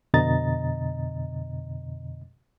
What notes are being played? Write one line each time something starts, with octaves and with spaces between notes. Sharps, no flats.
F2 B2 D3 D#5 A#5 A6